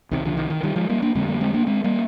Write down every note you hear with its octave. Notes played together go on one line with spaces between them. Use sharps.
C2 C3 D#3
D3 F3
D#3
D#3
D#3 G3
F3 G#3
G3 A#3
A#3 D4
F2 D3 G#3 C4
G3 A#3
G#3 C4
A#3 D4
G#3 C4
G3 A#3